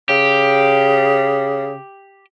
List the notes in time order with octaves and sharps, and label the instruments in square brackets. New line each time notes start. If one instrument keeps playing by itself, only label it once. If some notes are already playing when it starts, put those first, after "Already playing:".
[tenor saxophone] C#3 [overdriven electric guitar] G4